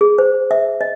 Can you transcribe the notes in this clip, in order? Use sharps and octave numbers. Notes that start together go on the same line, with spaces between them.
G#4
C5
E5
D#5